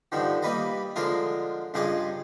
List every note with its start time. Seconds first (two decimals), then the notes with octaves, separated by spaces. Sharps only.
0.12 G2 D3 D#3 F3
0.42 G3 A#3 B4 D#5
0.96 D3 F3 G#3 F4 A#4
1.74 C#2 G2 F3 G#4 D#5 D6